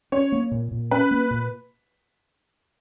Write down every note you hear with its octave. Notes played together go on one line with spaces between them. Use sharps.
C#4 C#5
A#3
A#2
A#2
C#4 B4
A#3
A#2